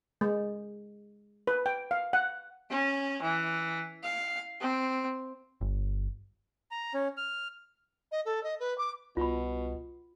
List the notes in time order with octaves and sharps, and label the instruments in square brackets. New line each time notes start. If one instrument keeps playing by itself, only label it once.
[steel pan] G#3
B4
G5
F5
F#5
[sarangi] C#4
E3
F5
C4
[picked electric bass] G1
[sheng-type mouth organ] A#5
C#4
F6
[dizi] D#5
A4
D#5
B4
D6
[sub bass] C2 [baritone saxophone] B2 [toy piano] F4 B5